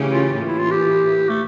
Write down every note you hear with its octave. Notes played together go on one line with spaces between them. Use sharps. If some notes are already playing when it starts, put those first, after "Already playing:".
Already playing: C#3 E3 A3 C#4 G4
F4
A2 E3 A#3
E4
F4
G4
A3